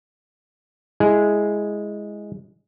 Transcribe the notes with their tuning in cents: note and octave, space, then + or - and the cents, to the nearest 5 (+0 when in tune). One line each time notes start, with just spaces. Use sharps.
G#3 +0 E4 +0 G#4 +0